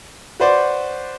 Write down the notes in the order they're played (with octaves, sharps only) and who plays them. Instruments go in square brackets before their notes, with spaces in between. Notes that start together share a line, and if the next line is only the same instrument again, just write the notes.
[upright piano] F#4 B4 C5 D5